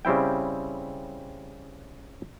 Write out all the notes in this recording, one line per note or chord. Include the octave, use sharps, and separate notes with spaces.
C#3 G3 C4 E4 G5